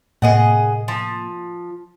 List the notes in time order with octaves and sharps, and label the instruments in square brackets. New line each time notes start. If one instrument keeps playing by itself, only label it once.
[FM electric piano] A2 C3 A#3 [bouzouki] G#4 D#5 F#5
[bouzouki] F3